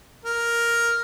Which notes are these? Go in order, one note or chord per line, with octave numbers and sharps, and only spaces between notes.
A#4